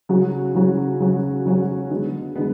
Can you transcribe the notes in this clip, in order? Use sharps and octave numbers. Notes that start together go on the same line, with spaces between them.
C#3 F#3 C#4 F#4
C#3 F#3 C#4 F#4
C#3 F#3 C#4 F#4
C#3 F#3 C#4 F#4
D3 G#3 B3
D3 G#3 B3